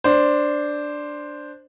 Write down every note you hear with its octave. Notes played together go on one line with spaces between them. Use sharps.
D4 C5